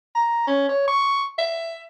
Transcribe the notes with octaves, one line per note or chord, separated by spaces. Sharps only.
A#5
C#4
C#5
C#6
E5